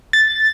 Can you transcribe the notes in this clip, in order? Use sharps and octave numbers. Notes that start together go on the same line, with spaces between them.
A6